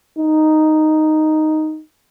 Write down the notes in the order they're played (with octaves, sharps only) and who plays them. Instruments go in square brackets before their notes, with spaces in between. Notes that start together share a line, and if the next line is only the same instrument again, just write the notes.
[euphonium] D#4